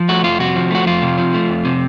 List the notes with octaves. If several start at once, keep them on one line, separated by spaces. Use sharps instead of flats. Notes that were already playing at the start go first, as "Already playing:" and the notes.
Already playing: F3
A3 F#4
F2 F4
C3 F#4
F3
A3 F#4
F2 F4
C3
F3
A3
F2
C3